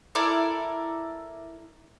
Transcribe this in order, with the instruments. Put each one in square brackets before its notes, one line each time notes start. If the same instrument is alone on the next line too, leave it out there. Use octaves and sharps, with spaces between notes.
[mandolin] E4 A4 A#4 D5